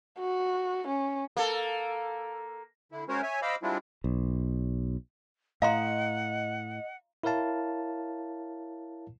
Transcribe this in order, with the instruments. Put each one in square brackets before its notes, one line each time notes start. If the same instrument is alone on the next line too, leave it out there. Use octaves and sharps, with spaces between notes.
[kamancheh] F#4
C#4
[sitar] A#3 A4
[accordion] D3 E4
G#3 C#4 F#4 A#4 C5 C#5
C#5 E5 G#5
C5 D#5 F5 B5 D6 E6
G3 G#3 C4 D4 E4 F4
[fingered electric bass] B1
[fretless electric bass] A2 [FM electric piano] D#5 [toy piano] F5 A#5 C6 [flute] F#5
[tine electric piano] E4 A#4 C#5 F5 A5